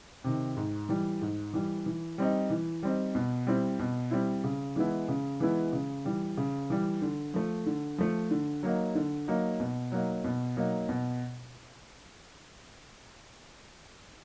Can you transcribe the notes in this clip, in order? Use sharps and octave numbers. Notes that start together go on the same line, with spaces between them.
C3 D#3
G#2
E3 G3
G#2
E3 G3
E3
G3 C4 D#4
E3
G3 C4 D#4
B2
G3 C4 E4
B2
G3 C4 E4
C#3
E3 G#3 B3 E4
C#3
E3 G#3 B3 E4
C#3
E3 G3
C#3
E3 G3
D3
F3 A3
D3
F3 A3
D3
F#3 A#3 D#4
D3
F#3 A#3 D#4
B2
F#3 A#3 D#4
B2
F#3 A#3 D#4
B2